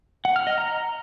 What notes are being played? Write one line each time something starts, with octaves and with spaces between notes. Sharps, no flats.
F#5
F6
D#5
A#5